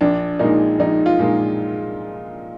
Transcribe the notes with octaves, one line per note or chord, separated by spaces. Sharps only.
A#1 D4
A#2 G#3 D#4
A#1 D#4
F4
A#2 G#3